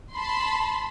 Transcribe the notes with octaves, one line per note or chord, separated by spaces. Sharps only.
A5 B5 C6